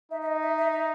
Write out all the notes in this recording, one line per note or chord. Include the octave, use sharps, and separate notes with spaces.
D#4 E5
E5
D#5
E5
E5
E5